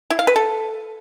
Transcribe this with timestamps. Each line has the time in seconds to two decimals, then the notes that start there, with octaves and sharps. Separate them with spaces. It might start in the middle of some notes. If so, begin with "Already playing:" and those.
0.10 E4
0.19 F5
0.27 B4
0.36 A4